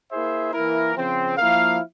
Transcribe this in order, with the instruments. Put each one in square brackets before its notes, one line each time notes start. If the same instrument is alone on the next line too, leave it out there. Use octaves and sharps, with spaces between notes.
[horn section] A#3 E4 G#4 C5 E5
E3 A#3 E4 A#4
C#3 F3 C4
F3 A#3 E4 A#4 F5